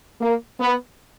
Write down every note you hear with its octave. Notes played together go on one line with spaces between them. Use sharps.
A#3
B3